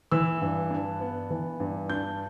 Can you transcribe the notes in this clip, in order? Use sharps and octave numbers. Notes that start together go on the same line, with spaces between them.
E3 E6
G2
D4
B3
E3
G2
D4 G6